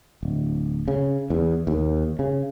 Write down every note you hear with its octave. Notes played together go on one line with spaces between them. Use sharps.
D1
C#3
E2
D#2
C#3